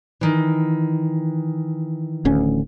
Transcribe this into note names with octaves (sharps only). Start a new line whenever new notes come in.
D#3 E3
D1 D2 C#4